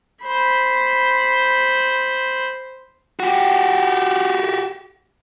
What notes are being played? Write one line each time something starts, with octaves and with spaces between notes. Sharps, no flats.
C5 B5
F#4 G4